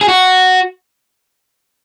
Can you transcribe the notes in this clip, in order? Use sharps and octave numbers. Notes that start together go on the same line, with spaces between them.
G#4
F#4